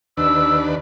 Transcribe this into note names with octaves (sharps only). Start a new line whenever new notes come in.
D#2 D4 B4 E6